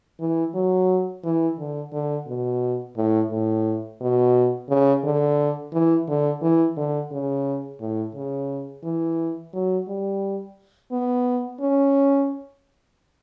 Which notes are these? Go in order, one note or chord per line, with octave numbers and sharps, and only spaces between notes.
E3
F#3
E3
D3
D3
B2
A2
A2
B2
C#3
D3
E3
D3
E3
D3
C#3
A2
C#3
E3
F#3
G3
B3
C#4